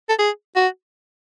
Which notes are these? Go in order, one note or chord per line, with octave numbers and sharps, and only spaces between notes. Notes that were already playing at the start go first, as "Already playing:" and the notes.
A4
G#4
F#4